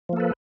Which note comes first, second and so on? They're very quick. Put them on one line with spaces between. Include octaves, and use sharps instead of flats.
F3 A#3 A4 B4